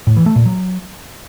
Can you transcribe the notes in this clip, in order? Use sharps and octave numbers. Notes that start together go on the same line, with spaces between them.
A2
E3
A3
A#2
F#3